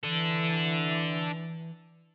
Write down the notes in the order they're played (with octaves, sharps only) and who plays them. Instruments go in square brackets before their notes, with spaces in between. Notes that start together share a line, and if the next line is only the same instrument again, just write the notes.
[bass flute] E3 [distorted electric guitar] D4 A4